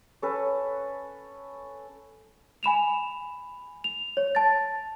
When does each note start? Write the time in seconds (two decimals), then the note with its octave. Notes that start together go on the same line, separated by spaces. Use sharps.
0.22 C#4 A4 B4
2.63 G#5 B5 E7 F7
3.84 F7
4.17 C#5
4.35 A5 A6